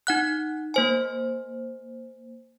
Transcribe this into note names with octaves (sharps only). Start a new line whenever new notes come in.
D#4 F#5 F#6
A#3 C5 G#5